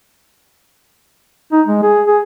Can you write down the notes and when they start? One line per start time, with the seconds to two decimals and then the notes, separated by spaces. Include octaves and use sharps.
1.52 D#4
1.67 G#3
1.83 G#4
2.07 G#4